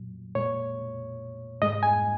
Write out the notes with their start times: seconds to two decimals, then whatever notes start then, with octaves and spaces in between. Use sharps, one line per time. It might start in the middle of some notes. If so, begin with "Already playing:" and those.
Already playing: A#2 F#3
0.35 A#2 G#3 C#5
1.62 G#2 G#3 D#5
1.83 G#5